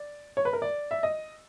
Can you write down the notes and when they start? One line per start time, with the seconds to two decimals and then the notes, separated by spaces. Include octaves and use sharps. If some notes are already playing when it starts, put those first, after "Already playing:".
Already playing: D5
0.37 C#5
0.45 B4
0.53 A#4
0.62 D5
0.91 E5
1.03 D#5